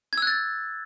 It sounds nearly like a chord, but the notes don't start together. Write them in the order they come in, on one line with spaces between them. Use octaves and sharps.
G#6 E6 F#6 A6